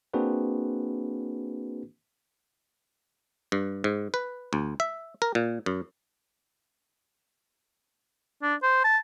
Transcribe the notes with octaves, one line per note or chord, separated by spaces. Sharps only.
A#3 C4 D4 F#4 G#4 B4
G2
G#2
B4
D2
E5
A#4
A#2
F#2
D4
C5
A5